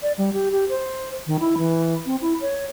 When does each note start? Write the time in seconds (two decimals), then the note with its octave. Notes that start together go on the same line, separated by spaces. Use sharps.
0.03 D5
0.18 G3
0.33 G4
0.52 G4
0.69 C5
1.27 D#3
1.40 E4
1.58 E3
2.06 C4
2.22 E4
2.41 C#5